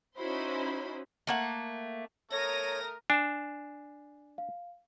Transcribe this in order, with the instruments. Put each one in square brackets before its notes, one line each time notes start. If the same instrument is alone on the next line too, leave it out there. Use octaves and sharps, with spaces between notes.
[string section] C#4 D#4 E4 F#4 C5 B5
[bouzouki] A3 A#3 F#5
[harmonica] A3 A#4 [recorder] C#5 [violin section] A#5 D#6 A#6
[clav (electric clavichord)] D4 [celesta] G#5 C7 E7
[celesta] F5